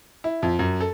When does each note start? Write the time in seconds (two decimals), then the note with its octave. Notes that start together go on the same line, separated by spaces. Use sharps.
0.24 E4
0.42 F2
0.59 F#2
0.80 A4